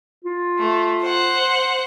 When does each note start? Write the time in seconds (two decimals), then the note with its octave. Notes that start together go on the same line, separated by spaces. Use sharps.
0.25 F4
0.59 A3
1.02 C5 F#5